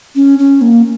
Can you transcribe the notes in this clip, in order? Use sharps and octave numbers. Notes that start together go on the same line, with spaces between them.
C#4
C#4
A#3